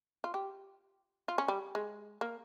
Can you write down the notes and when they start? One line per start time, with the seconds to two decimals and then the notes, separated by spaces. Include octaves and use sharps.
0.24 F4
0.34 G4
1.28 F4
1.38 C#4
1.48 G3
1.75 G#3
2.21 A#3